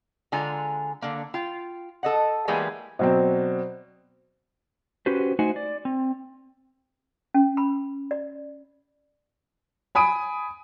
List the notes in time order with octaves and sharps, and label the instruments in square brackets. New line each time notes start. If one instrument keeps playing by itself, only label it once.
[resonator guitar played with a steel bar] D3 G#3 F4 G#5 A#5
D3 A#3
F4 G5
A4 D#5 F#5
E3 G3 G#3 A#3 B3
[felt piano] B2 F#3 C4 [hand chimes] C5 D5
[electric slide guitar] C#4 F#4 G4 B4 C5
A3 D#4 F#4 C5 F#5 G#5
D5
C4
[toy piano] C#4
B5
D5
[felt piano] G#5 B5 D#6 D7